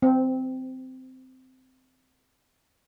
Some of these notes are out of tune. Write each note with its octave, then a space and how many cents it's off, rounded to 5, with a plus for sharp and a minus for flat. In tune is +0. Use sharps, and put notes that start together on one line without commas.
C4 -15